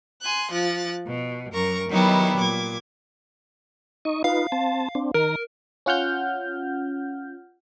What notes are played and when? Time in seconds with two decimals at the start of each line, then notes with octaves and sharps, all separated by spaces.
0.23 G#5 C6 F#6
0.52 F3 F#6 A6
1.06 B2
1.52 F#2 A#4 A#5 C#6
1.89 D#3 F#3 G3 B3 D#4 E4
2.38 A#2 D6 G#6
4.05 D#4 D#5 C#6
4.24 D#4 F4 B4 F5
4.52 C4 A5
4.95 C4 D4
5.14 D#3 A#4 A#5
5.86 C#4 F4 F#5 F6 G6